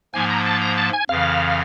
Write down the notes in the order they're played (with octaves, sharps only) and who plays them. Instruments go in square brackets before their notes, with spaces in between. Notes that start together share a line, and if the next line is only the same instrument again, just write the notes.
[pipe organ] G#2 F3 A#3 [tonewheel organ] G#5
[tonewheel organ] A#5
A5
A#5
A5
G#5
[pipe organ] F2 C#3 E3 [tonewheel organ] F5